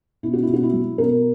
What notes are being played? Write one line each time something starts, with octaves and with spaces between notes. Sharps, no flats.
B2 E4
F#4
E4
B2
F#4
E4
F#3
B2 A#4